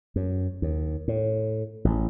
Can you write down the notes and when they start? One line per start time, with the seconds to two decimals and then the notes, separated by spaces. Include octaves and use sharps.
0.16 F#2
0.62 D#2
1.08 A2
1.85 A1